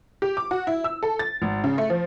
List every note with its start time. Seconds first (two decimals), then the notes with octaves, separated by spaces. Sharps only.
0.22 G4
0.37 D6
0.51 F#4
0.67 E4
0.84 E6
1.03 A4
1.19 A6
1.42 G#1
1.64 C#3
1.78 A3
1.90 F3